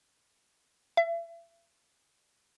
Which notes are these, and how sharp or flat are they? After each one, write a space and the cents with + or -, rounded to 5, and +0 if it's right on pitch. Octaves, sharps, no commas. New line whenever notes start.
E5 +35